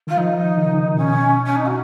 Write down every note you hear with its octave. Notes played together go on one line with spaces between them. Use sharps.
D#3 F4
F3 D#4
D#3
C#3
D#3
B2 C#4
C#4
D#4
F#4